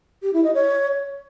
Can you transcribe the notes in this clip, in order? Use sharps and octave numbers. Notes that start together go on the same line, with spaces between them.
G4
E4
D#5
C#5